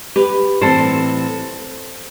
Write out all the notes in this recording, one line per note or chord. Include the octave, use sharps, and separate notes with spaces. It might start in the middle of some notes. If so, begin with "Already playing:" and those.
G4 B4
A2 E3 G3 C4 A4 C5